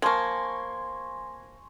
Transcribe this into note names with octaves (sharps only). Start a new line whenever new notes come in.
F3 A#3 G#5 C6 C#6